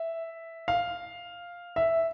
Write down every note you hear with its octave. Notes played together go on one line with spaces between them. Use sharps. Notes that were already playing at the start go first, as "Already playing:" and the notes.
Already playing: E5
F5
E5